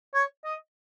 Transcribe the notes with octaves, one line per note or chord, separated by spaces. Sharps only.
C#5
D#5